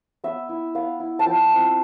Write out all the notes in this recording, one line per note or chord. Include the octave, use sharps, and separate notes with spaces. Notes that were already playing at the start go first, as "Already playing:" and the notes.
B3 E5
E4
B3 F5
E4
A5
F3 G5
C4 E4